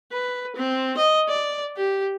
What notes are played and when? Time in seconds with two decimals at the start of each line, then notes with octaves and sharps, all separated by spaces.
0.12 B4
0.56 C4
0.97 D#5
1.28 D5
1.77 G4